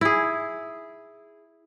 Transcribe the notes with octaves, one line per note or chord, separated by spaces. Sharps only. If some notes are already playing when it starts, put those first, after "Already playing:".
E4 G#4